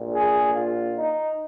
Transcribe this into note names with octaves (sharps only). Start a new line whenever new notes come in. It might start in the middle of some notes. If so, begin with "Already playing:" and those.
Already playing: A#1 A#2
G#4
F4
D#4